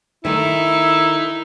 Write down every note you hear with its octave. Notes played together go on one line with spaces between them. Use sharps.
D#3 A3 D#4 E4